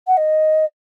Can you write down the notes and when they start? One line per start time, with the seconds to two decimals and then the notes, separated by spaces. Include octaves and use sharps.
0.07 F#5
0.17 D#5